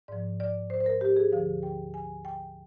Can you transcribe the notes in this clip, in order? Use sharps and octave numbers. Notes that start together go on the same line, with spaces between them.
G#2 F3 D5
D5
C5
C5
A#4
G4
G#4
D2 D3 F3 F5
G5
G#5
G5